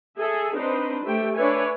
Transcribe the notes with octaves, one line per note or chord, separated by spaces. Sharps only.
G#4 A4 E5 G#5
C4 D4 D#4 B4 C5
A3 G4 E5 G5
D4 B4 C#5 E5 G#5